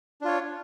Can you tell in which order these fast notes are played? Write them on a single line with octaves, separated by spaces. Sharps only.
D4 F4 C#5